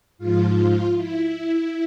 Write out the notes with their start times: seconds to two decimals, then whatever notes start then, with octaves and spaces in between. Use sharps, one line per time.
0.18 G#2 F4
0.24 F3
0.96 E4